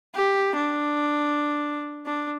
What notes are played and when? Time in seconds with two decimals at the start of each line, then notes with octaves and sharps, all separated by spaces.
0.14 G4
0.56 D4
2.06 D4